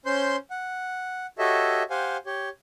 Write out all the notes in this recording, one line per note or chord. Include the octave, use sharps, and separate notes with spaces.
C#4 C5 C6 G6
F#5
F#4 G4 A4 C#5 D#5 E5
G4 C5 F5 F#5 G#5
G4 C#5